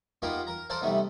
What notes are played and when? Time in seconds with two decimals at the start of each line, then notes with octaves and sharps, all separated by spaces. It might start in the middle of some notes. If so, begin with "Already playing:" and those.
0.22 A#3 B3 D#4 F4 G4 A#4
0.47 A#4 A#5
0.70 A4 A#4 C5 D5 F5
0.82 C3 G3 A3 B3 D#4